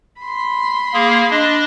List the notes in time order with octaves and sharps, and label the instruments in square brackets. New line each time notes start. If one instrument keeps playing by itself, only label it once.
[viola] B5 C6
[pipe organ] A#3 G#4
D4 D#5